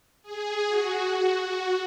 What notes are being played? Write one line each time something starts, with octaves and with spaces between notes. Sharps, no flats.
G#4
F#4
F#4
F#4